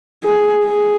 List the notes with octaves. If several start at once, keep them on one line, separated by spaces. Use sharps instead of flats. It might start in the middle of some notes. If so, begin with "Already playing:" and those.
G#4
G#4